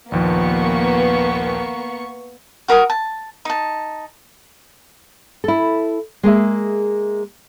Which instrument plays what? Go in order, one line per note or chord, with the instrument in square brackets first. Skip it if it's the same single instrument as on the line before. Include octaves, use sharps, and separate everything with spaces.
[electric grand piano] A#1 D#2 F3 [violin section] A#3 B3 C#6
[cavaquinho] F#4 A#4 A#5 D#6
A5
D#4 A5
[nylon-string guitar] E4 A4
G#3 A#3 G#4 E5